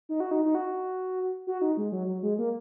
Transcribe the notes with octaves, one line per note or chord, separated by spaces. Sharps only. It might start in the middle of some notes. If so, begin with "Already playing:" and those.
D#4
F#4
D#4
D#4
F#4
F#4
D#4
G#3
F#3
F#3
G#3
A#3